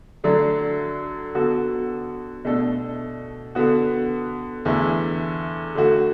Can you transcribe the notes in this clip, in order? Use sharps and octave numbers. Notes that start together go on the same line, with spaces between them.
D3 F#3 A3 D4
D3 B3 F#4 A4
B2 A3 D4 A4
D3 B3 F#4
E2 D3 A3 E4
D3 A3 F#4